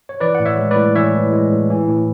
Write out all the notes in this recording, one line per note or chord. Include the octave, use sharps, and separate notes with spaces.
C#5
E3 B4 D5
F#5
A2
C#5 E5
G#3
B4 D5
A2
E3 C#5 E5
A2
G#3
A2
E3
A2